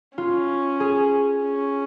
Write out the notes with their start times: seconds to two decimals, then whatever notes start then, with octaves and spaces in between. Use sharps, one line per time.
0.18 C#4 F4
0.80 G#4
1.44 C#4